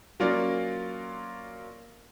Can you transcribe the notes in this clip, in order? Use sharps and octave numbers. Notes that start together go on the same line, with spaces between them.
F#3 A#3 C#4 F4 A#4 D5